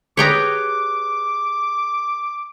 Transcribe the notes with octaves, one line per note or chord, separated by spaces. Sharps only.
G4 G#4 B4 C#5 G5 A#5 D6